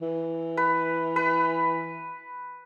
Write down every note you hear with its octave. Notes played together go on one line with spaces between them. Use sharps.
E3
B4
B4